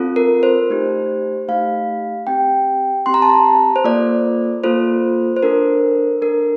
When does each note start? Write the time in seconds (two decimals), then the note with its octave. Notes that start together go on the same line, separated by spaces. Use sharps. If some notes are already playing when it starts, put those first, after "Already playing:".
Already playing: C4 F4 A4
0.16 A#4
0.43 C5
0.70 A3 D#4 G4
1.48 A3 D#4 G4 F5
2.27 C4 G4 G5
3.06 C4 G4 C6
3.14 A#5
3.22 A5
3.30 A#5
3.76 C5
3.84 A#3 F4 A4 D5
4.64 A#3 F4 A4 C5
5.36 C5
5.43 D4 A4 A#4
6.22 D4 A4 A#4